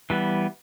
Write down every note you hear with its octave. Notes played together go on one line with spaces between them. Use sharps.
E3 G3 B3